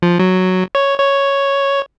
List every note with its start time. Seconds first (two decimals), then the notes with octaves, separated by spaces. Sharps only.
0.02 F3
0.19 F#3
0.75 C#5
0.99 C#5